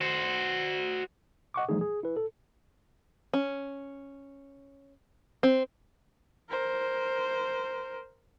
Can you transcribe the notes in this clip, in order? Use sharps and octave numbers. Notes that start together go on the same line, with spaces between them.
F#4 C5
D#5 F#5 C#6 D6
E3 F3 G3 A3 D#4 G#4
G#4
E4 B4
A4
C#4
C4
A#4 C5